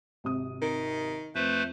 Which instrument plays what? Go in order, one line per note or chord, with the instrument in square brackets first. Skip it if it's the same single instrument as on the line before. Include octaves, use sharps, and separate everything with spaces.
[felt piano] G#1 C3 D#6
[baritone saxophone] D#3
[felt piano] F2 [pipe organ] A3 B4 C5